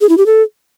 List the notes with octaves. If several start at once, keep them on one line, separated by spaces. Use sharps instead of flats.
G#4
E4
G4
A4